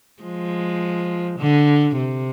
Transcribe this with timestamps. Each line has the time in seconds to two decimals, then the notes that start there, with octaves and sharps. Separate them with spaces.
0.23 F3 G#3
1.39 D3
1.97 C3